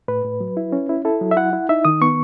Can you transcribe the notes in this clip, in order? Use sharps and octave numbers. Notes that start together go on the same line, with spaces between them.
A2 B4
A2
F#3
E4
C#4
E4
E4 A4
F#3
E5
E4 F#5
E4
D#4 E5
D#3 D#6
B3 C#6